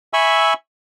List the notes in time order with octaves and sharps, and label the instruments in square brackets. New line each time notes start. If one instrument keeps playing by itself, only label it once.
[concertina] E5 G#5 B5 C#6 E6